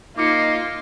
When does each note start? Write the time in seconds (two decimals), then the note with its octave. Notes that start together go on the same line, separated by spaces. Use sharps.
0.18 A#3 D#4 F4 D6 C#7